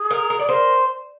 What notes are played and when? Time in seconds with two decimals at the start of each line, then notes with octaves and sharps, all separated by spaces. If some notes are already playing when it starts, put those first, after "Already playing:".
Already playing: G#4
0.11 A#4
0.30 A#4
0.39 G#4 D5
0.49 A#4 C5